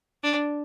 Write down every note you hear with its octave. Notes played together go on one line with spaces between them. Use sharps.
D4